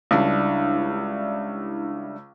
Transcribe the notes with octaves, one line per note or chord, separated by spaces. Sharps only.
C#2 G3 D4 E4